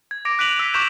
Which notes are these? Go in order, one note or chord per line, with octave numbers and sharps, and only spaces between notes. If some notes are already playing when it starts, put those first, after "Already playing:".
G#6
D6 A#6 D7
F#6 B6 D7 D#7 F7 F#7
E6 B6
C#6 D6 F#6 G6 B6 E7